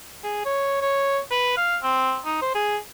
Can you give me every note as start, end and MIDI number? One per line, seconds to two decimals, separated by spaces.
0.24 0.45 68
0.45 0.77 73
0.81 1.19 73
1.31 1.53 71
1.57 1.78 77
1.83 2.19 60
2.26 2.37 63
2.42 2.51 72
2.55 2.77 68